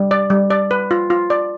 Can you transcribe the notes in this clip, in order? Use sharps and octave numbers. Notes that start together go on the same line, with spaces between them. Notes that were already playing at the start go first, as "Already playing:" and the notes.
Already playing: G3
D5
G3
D5
B4
F4
F4
D5